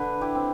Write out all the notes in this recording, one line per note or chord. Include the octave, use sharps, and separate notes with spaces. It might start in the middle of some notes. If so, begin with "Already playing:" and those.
Already playing: D3 B4
E4 G4
C4